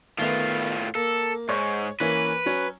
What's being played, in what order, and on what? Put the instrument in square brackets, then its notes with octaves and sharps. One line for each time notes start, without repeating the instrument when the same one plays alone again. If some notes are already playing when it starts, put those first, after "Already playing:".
[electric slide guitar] A2 F4 [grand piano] D#3 A3 B3
[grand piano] A#3 [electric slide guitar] A4
[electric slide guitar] G#2 [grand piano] C#5 C#6
[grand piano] E3 A#3 C#4 [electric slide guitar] B4
[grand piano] F#3 C#4